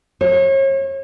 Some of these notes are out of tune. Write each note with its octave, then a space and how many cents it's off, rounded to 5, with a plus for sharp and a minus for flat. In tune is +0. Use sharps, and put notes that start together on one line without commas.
C#5 -40